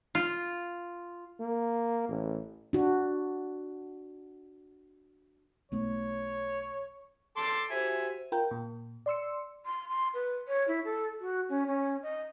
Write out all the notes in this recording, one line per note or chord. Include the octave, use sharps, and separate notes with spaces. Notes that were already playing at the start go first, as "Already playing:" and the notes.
F4
A#3
A1
D4 F#4
B1 A3 B3 C#5
A4 C6 D6
F#4 G4 C5 E5 G#5
F4 A#4 G5
A#2
D5 C6 E6 C#7
C6
C6
B4
C#5
E4
A4
F#4
C#4
C#4
D#5